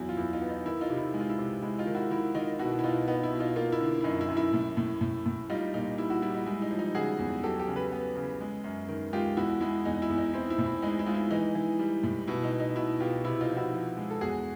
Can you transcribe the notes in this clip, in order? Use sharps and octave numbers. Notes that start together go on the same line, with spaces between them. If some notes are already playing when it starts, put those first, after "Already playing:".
Already playing: E2 F#3 E4
F4
E2 E4
D#4 F4
B3
D#4
D#3 E4
D#4 F4
C3
E4
G#3
F4
E4
C3
G#3 E4
D#4 F4
D#3
E4 F#4
D#3 E4
D#3 D#4 F4
B2 E4 F#4
E4
B2 D#4 F4
B3 D#4
E4
B2
D#4 F4
A#3 D#4 F4
E4
D3
E4
F#2 D#4
E4
F#2
E4
A2
A2
A2
A2
G3 D#4 F4
A#2 D#4
G3 E4
E4 F#4
G3 E4
D#4
G#3 E4
D#4
F3
D#4
C#3 F#4 G#4
E2
F#3 G4 A4
G4 A4
C#3
A4 B4
B3
C#3
G#3
F#2
D#3
G#3 F4 G4
E2 E4 F#4
G#3 E4
E2 D#4
E4
E2
D#4
C4 E4
E4
A2
E4
G#3 D#4
E4
G#3 F4
E4
E3 D#4
E3
G3
A2
B2 E4
D#4
B2
D#4
B2 E4
B2 F4 G4
C3 E4
D#4 F4
F3
E4 F#4
F3
G#3
A4
E2 F#4 G#4